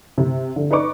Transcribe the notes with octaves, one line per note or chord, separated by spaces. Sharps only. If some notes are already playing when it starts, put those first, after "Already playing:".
C3
D3
D#4 B4 D5 C#6 D6